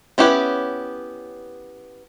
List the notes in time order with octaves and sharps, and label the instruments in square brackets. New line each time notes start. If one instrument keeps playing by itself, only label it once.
[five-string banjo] B3 C#4 E4 G4 B4